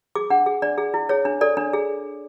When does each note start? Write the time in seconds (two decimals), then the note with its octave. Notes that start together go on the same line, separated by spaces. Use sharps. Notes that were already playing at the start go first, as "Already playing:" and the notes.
0.15 G#4 D6
0.30 D4 F#5
0.46 G#4
0.62 D4 D5
0.78 G#4
0.94 E4
1.09 G#4 C#5
1.25 D4
1.41 A4 D5
1.57 D4
1.73 G#4